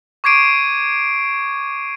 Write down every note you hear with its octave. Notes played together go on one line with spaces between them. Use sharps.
C#6 D6 G#6 C7 D7 D#7